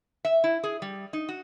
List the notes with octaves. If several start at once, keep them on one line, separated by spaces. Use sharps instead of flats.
E5
E4
G#4
G3
D#4
F#4